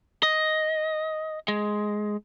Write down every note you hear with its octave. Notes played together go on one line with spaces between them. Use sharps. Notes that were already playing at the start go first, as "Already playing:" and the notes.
D#5
G#3